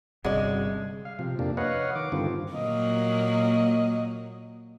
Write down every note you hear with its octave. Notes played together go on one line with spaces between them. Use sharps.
G1 G2 C3 G#3 F#4 D5
F5
C3 F3
F2 C3 A#3 D4
B4 C#5 D#5 F5 F#5
D#3 D6
G2 D3 D#3 C4 F4
A#2 F#3 A#3 D#5